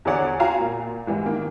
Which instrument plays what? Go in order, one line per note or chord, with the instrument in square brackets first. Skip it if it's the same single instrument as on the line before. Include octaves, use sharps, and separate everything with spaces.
[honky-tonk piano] E2 D3 G#4 C#5 D5 F#5
F4 F#4 F5 G5 G#5 A#5
A#2
G#2 E3 G3
D#3 A#3